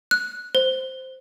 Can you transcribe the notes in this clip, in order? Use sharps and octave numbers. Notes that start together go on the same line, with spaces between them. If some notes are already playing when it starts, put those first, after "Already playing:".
F#6
C5